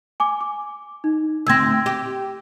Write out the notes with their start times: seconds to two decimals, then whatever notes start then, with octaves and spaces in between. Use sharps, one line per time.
0.20 G#5 D6
0.41 D6
1.04 D#4
1.47 D2 C4 E6 G#6 A#6
1.86 G4